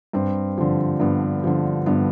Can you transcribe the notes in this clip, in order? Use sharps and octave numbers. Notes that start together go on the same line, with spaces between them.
G2 C4
D3 F3
G2 B3
D3 F3
G2 B3